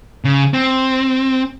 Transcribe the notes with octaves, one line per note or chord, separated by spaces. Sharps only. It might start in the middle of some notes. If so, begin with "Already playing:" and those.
C#3
C4